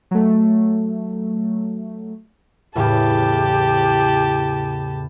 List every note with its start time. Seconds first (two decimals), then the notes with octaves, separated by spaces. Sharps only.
0.11 F#3 A3
2.75 E2 A2 C#3 G4 A5